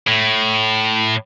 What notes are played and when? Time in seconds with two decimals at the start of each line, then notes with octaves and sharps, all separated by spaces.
0.07 A2